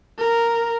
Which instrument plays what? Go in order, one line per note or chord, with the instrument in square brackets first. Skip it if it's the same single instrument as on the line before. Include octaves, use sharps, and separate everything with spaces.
[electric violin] A#4